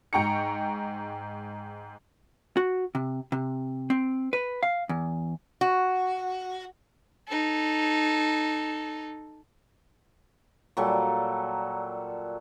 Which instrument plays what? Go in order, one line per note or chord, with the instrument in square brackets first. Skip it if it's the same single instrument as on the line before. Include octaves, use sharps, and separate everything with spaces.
[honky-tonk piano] G#2 G5 A#5 C#6 C#7
[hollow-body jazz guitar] F#4
C3
C3
C4
B4
F5
E2
[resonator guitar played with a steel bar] F#4
[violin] D#4 A4
[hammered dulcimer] A#2 F#3 G3 A4